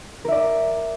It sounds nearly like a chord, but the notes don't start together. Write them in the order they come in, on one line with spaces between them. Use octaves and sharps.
A#4 E5 D5